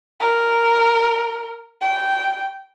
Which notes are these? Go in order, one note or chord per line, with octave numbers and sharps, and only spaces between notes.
A#4
G5